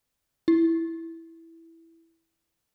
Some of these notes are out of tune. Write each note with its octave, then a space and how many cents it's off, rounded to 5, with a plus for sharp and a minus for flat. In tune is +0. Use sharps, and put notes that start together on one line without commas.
E4 +0